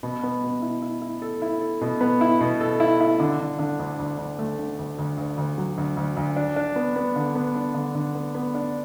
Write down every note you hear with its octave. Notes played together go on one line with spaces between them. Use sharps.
B2
B3
B2
E4
E4
E4
A4
E4
A4
B2
B3
E4
B2
A4
E4
E4
D3
D3
D3
D2
D2
D2
A3
D3
D2
D2
D2
D2
F#3
D2
D2
D2
D4
D4
B3
B3
D3
B3
D4
D3
D3
B3
B3
D4